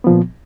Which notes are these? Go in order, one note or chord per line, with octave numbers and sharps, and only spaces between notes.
A#2 F3 B3